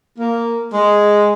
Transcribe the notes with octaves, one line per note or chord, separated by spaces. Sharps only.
A#3
G#3